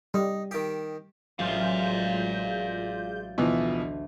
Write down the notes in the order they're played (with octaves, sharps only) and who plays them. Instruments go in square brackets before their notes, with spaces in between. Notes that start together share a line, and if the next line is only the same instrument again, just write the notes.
[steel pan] G3 [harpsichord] D#4
[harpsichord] D#3 G4
[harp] A1 F#3 [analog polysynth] G#3 F4 G6 [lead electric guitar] D5 F5
[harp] D2 [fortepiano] B2 E3 F3